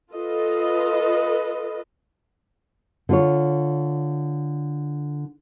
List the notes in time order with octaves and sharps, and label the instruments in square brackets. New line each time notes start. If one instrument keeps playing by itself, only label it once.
[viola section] F4 A4 B4 D#5
[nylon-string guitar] D3 F4 C#5